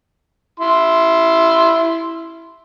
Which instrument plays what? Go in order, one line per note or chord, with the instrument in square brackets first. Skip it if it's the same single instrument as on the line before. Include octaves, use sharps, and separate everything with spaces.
[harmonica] E4 C6